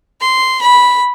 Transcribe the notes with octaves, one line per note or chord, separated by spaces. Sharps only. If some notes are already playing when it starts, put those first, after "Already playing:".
C6
B5